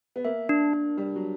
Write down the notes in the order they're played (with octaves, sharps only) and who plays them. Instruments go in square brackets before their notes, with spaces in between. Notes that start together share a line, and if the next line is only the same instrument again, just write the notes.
[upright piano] B3
[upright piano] A#3 [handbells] E5
[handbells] D4
D4
[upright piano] G3 [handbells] D4
[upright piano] F#3